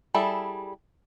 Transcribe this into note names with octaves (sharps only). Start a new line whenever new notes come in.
G3 E4 G#4 A4